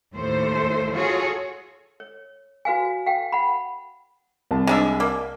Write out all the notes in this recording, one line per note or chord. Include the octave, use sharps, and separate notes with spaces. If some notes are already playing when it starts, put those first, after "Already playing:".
D#2 A2 A3 C5
F4 F#4 G#4 A4 C#5
C#5
F#4 B4 F5 G#5
F5 G5
F#5 B5
C2 A5
G#3 D4 E5
A#3